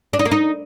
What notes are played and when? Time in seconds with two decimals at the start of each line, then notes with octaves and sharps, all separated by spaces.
0.13 D4
0.19 D#4
0.25 A#3
0.31 D#4